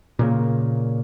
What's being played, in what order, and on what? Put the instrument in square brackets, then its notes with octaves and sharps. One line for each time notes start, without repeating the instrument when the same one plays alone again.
[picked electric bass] A#2 C#3 A#3